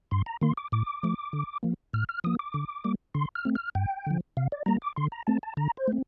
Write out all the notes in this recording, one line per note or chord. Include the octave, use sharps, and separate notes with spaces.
G2 C6
A#5
D#3 A#3 C6
D6
A2 D6
F3 A3
D3
F3 A#3
A2 F6
F6
F3 A#3 D#6
D6
D3
G3 A#3
D3 C6
F6
A3 C4
F6
G2 G5
D3 F3
C3 F5
D5
G3 A#3 A#5
D6
D3 C6
A#5
A3 C4 A5
A5
D3 A#5
C5
A3 C4